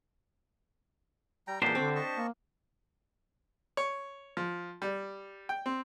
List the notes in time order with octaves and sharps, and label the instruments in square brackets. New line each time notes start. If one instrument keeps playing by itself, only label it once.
[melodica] G3 G5 A#5
[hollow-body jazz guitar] E2 A#2 [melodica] G3 A#3 B3 [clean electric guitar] D4 G4 C5
[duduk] D3 [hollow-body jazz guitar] C4 [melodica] F#4 D6
[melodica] D#5 A5 C#6
[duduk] A#3
[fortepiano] C#5
F3
G3
G5
C4